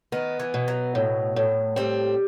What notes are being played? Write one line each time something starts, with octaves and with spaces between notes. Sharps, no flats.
D#3 B3
E3
B2
F#3
A2
A2
G3 C4